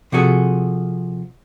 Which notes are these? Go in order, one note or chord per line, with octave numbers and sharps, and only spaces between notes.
C3 F3 F#4 G#4 A4